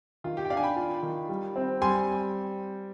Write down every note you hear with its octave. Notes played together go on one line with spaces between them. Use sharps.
D#3 F4
G4
G5
D4 D5 F5
G#5
G5 B5
F4
D#3
G3
C4
G3 G#5 C6